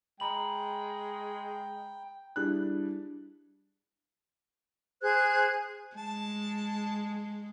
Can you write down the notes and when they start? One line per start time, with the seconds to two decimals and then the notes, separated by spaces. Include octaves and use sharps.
0.20 G#3 G5 A#5 B5 F#7
2.36 G3 D4 E4 G#4 F#6
5.01 G#4 C5 F#6 G#6
5.97 G#3 A5